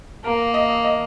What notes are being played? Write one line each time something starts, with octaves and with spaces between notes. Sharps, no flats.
A#3 A#4
D#5
D#5